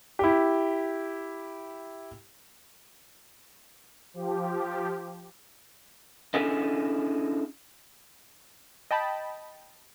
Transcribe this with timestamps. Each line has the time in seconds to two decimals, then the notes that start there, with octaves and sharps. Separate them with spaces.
0.19 E4 G4
4.14 F3 G4
6.34 C#4 D4 E4 G#4 A4 D#5
8.91 D#5 G5 A5 B5